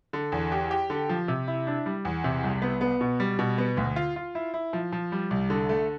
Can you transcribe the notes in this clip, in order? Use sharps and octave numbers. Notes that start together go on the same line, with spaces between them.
D3
E2
G4
G4
D3
F3
C3
E4
D4
G3
E2
C3
C2
B3
B3
B2
G3
B2
B3
D2
F4
F4
E4
E4
F3
F3
G3
C2
D3
A3